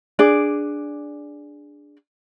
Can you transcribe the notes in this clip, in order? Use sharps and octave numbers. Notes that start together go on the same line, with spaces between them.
D4 G#4 D5